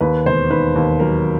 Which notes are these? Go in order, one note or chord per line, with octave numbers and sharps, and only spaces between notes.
D#2 B4
E1 C5
D#3 B4
D#2
F#3 A#4